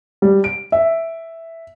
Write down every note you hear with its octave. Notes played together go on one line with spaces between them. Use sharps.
G3
D7
E5